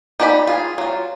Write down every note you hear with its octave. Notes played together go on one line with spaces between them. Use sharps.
D#4 G4 D5 A5 B5
F4 G#4
F#3 F4